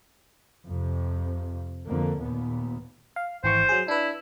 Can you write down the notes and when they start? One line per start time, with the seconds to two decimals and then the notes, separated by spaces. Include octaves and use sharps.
0.66 F2 C3
1.86 F2 D3 A#3
2.19 D#2 A#2 B3
3.16 F5
3.44 G#1 E3 C5 C#6
3.69 F#3 G#4
3.88 D4 E4 B4